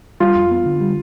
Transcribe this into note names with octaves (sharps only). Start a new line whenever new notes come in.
G3 F4
F2
B3
D3
G3